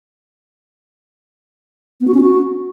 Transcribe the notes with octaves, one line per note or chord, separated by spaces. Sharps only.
B3
F#4
C#4
F#4